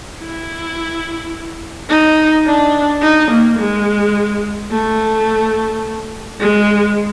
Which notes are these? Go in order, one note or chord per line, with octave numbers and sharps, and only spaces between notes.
E4
D#4
D4
D#4
A#3
G#3
A3
G#3